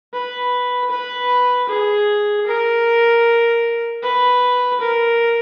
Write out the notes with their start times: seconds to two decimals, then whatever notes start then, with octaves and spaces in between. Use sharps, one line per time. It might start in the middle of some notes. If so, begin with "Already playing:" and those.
0.13 B4
0.91 B4
1.69 G#4
2.47 A#4
4.02 B4
4.80 A#4